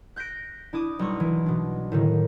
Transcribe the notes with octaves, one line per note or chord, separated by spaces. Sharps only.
F#6 G6 A#6 B6 D7
D4 E4 D6 D#6
B1 G3 C#6 D#6
E3
B2 D4
A2 D3 D#3